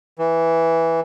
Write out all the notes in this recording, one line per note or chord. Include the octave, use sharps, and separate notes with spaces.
E3